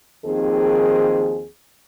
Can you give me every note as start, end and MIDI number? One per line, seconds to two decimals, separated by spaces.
0.25 1.46 39
0.25 1.46 51
0.25 1.46 53
0.25 1.46 60
0.25 1.46 68